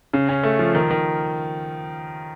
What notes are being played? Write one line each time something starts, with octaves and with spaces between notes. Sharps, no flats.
C#3
C#4
A3
F3
D#3
D#3